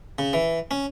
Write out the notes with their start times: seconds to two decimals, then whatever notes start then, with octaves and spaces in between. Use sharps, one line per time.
0.19 C#3
0.33 E3
0.71 C#4